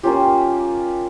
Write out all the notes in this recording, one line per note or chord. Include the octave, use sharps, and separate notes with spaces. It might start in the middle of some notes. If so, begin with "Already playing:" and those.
A#3 C#4 F4 G4